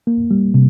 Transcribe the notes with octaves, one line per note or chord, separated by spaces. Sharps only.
A#3
G3
C3